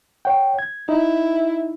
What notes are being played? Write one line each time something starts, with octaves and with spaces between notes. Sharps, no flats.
C#5 F#5 G5
G#6
D#4 E4